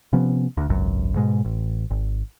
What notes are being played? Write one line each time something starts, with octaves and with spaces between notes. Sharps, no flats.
C3 F3 B3 C#4
D2 D3
G#1 C#2 F#2
G#2 B2 G#3
A1
G#1